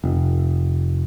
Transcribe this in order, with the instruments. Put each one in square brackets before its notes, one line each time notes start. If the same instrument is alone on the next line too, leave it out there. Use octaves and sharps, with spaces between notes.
[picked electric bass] F1